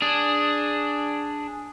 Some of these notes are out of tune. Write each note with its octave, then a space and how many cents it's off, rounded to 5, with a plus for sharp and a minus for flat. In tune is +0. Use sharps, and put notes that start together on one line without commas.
D4 +0 G#4 +0